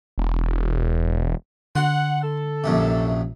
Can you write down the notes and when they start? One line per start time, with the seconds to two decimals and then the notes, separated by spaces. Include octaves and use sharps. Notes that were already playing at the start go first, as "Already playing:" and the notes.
0.18 E1
1.75 D3 F#5 C6
2.23 A4
2.64 A#1 F#2 C3